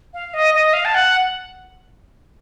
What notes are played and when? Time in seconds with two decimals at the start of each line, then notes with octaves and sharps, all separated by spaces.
0.14 F5
0.34 D#5
0.54 D#5
0.73 F5
0.85 A5
0.95 F#5